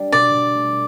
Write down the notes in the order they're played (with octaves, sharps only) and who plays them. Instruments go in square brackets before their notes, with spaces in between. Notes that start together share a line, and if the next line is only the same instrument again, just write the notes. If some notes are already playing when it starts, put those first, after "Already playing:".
Already playing: [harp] G3 D4
[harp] B2 [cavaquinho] D5
[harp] B2
A3